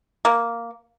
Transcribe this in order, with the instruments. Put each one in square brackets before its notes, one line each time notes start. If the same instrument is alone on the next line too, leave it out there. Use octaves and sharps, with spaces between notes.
[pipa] A#3